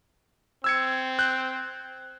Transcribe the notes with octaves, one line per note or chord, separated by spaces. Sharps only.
C4 E6 G#6 C#7
F#6 G6